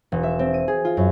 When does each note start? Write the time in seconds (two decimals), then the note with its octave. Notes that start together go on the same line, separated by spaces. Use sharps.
0.12 E1
0.23 E5
0.39 C4
0.54 D#7
0.68 G#4
0.85 F4
0.97 F#2